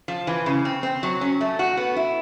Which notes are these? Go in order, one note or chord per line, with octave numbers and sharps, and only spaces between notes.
F3
E3
C#3
C4
C4
F#3
C#4
A3
F#4
B3
E4